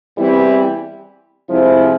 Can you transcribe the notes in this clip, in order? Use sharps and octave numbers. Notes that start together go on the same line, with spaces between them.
E2 E3 G3 C4 E4
C3 F3 G#3 E4